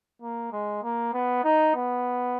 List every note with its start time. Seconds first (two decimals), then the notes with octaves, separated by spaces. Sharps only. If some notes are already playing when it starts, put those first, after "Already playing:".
0.22 A#3
0.52 G#3
0.83 A#3
1.13 B3
1.44 D#4
1.76 B3